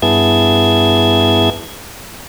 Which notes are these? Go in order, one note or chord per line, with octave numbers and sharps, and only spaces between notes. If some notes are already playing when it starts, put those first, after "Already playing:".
G2 B3 E4 G#4 A5 G#6